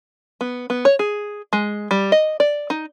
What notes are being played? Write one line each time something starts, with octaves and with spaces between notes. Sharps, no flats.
B3
B3
C#5
G#4
G#3
G3
D#5
D5
D#4